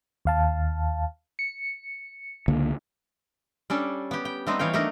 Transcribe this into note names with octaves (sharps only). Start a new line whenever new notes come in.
D#2 F5 A5
C#7
C#2 D3 A#3
G3 C#4 D4 A4
B3 G4
G5
G3 A3 B3 C4 D#4 C5
E3 C#5 F5 G5
F#3 A3 A#3 D4 D#4 A#4